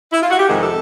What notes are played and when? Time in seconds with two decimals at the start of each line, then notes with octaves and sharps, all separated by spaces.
0.13 E4
0.22 F4
0.31 F#4
0.39 G4
0.48 F2 C3 D#3 G#3 G#4
0.63 A4